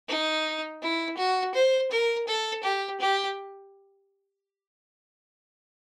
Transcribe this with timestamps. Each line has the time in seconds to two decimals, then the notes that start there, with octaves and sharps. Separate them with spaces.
0.09 D#4
0.82 E4
1.18 F#4
1.54 C5
1.91 A#4
2.27 A4
2.63 G4
3.00 G4